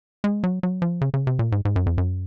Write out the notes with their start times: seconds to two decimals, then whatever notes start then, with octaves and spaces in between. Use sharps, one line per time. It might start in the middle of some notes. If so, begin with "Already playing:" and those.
0.24 G#3
0.44 F#3
0.63 F#3
0.82 F3
1.01 C#3
1.14 C#3
1.27 C3
1.39 A#2
1.52 G#2
1.65 G#2
1.76 F#2
1.86 F2
1.98 F#2